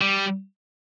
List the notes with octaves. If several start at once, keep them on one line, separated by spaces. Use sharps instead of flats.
G3